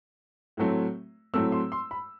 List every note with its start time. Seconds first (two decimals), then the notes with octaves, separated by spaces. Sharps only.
0.57 A2 F#3 A3 C4
1.34 A2 F#3 A3 C4 E6
1.52 C6
1.72 C6
1.91 B5